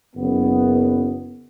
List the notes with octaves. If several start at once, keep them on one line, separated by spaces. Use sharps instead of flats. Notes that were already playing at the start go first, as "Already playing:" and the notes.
F#1 F#2 B3